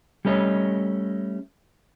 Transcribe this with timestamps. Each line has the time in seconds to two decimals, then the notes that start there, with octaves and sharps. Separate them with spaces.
0.25 G3 A3 C#4 C#5 D#5